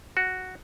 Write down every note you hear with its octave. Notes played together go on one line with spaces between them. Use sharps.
F#4